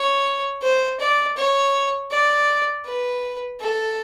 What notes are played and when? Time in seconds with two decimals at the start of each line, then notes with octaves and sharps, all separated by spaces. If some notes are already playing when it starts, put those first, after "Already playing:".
Already playing: C#5
0.62 C5
1.00 D5
1.37 C#5
2.11 D5
2.86 B4
3.60 A4